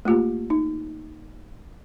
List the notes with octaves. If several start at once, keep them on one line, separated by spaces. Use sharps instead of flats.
A3 A#3 F4 G4
D#4